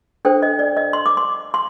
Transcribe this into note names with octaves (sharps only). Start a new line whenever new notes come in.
D4 A4 C5 G5
D#5
D5
D#5
C6
D6
C6
C6